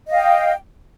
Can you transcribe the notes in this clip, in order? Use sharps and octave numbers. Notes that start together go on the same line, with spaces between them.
D#5 F5 G5